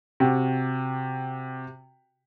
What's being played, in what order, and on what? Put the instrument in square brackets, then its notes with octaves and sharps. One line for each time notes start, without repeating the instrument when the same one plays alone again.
[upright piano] C3 F#4 G4